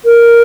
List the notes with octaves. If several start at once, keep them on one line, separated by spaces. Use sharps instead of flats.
A#4